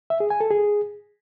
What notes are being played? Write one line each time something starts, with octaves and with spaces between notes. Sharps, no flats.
E5
G#4
G#5
A4
G#4